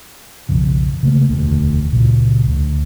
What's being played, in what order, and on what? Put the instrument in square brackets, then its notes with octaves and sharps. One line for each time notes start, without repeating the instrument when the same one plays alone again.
[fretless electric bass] B1 F2 C#3
C#3 A3 A#3
E1 D2
C#2 A#2
D2